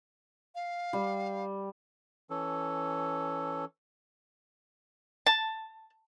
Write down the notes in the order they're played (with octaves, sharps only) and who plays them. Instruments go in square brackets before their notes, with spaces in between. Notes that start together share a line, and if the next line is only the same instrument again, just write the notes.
[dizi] F5
[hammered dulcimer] G3
[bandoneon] E3 C#4 A4
[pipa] A5